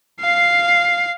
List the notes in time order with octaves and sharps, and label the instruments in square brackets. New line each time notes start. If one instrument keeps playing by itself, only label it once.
[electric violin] F5 C7